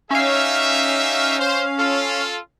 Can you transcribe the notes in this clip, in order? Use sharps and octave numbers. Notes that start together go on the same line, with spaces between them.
C#4 D#4 G4 E5 F5
C5
F4 A4